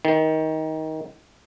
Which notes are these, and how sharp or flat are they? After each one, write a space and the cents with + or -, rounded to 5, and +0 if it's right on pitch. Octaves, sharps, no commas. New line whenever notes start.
D#3 +20